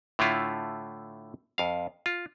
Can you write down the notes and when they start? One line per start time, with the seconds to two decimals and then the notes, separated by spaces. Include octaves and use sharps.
0.19 A2 D3 A3 E4 F4
1.58 F2 F5
2.06 F4